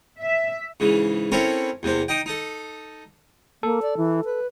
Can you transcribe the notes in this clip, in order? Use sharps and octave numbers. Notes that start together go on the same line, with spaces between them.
E5
G#2 C#3 E3
C4 C#4 E4 A4 A#4 C#5
E2 C3 A#3 C5
D#4 D#5 G5
D#4 A4
A#3 A4
D5
E3
B4